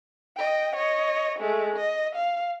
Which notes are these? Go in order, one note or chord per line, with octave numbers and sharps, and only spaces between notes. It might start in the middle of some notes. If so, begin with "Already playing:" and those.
D#5 G5
C#5 D#5
G#3 A3
D#5
F5